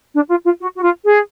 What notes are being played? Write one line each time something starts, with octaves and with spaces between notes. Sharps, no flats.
D4
F4
F4
F#4
F#4
F4
G#4